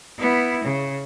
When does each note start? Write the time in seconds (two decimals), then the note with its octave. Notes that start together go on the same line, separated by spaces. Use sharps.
0.19 B3 E4
0.65 C#3